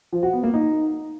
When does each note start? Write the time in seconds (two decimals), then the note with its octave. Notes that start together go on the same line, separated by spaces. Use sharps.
0.13 F3
0.23 F#4
0.33 B3
0.43 A#3
0.54 D#4